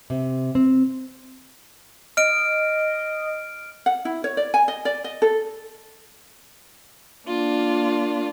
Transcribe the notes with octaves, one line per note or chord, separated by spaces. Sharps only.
C3
C4
D#5 F6 D7
F#5
E4
C#5
D5
G#5
D#5
D5
D#5
A4
A#3 D4 F4